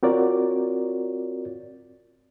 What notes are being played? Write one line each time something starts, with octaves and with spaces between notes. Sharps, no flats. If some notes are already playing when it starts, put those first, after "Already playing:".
C4 F4 F#4 A#4 C#5 D5